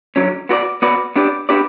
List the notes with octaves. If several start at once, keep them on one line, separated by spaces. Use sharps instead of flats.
D3 F#3 C#4
B3 F#4 B4 D5
B3 F#4 B4 D5
B3 D4 G4 D5
B3 D4 G4 D5